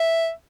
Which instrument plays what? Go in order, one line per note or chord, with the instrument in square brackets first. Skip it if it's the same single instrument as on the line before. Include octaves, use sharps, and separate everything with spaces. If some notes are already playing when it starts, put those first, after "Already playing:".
Already playing: [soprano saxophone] E5